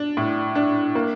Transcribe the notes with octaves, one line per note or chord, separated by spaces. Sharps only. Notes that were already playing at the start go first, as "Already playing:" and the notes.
Already playing: D4
A2
D4
A#3